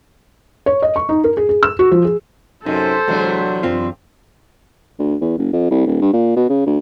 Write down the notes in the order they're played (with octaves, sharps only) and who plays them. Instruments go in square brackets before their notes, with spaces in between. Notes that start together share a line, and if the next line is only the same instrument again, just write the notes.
[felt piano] C#5
D#5
C#6
D#4
A#4
G#4
G#4
E6
F#4
F3
G#4
[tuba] F#2 [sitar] C3 [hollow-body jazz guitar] D#4 [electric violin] A4 C5
[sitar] E2 C3 D4 [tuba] F#3 [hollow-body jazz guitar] G#3
[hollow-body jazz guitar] F#2 C4 F4
[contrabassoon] D2
E2
F#1
F2
C2
D#1
G2
A#2
B2
C#3
D2